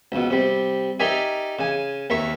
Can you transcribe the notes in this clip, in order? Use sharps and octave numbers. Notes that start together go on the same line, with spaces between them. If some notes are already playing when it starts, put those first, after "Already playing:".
C#2 B2
C3 G3
D#4 G4 A#4 D5 E5 G#5
C#3 G#5
D#2 A#4 E5 C#6